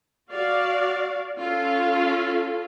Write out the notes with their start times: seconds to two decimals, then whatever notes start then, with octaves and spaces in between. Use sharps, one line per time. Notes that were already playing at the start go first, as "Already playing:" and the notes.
0.31 F#4 D5 F5
1.36 C#4 F4 A4